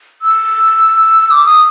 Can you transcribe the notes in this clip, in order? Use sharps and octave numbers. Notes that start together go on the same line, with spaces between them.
E6
D6
D#6